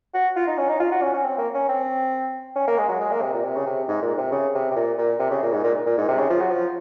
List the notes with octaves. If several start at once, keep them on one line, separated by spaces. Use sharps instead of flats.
F#4
F4
D#4
C#4
D#4
F4
F#4
C#4
C#4
C4
A#3
C#4
C4
C#4
A#3
G#3
F#3
G#3
A#3
C3
A#2
C3
C#3
C3
G#2
A#2
C3
C#3
C3
C3
A#2
A#2
C3
C#3
A#2
G#2
A#2
A#2
G#2
C3
C#3
F3
F#3
F3